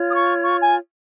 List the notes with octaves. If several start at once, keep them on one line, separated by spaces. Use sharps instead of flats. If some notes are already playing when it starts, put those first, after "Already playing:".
Already playing: F4 C#5
D#6
C#6
C#6
G#5